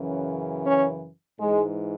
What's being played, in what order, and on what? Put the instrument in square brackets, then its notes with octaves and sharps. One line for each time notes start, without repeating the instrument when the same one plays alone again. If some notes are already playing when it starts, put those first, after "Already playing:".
Already playing: [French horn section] F#2 C#3 E3
C#4
G#2 E3 G#3